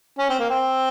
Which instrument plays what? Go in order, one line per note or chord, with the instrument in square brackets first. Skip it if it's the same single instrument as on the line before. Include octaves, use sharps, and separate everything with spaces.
[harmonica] C#4
C4
A#3
C4